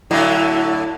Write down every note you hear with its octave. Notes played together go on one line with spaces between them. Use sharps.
A2 D3 F#3 E4